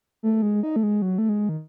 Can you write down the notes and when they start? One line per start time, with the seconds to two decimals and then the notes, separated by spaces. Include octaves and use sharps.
0.23 A3
0.42 G#3
0.63 D#4
0.76 A3
0.83 G#3
1.02 F#3
1.18 A3
1.29 G#3
1.49 D#3